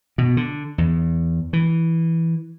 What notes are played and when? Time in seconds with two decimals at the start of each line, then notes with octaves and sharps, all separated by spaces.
0.18 B2
0.37 D3
0.78 E2
1.53 E3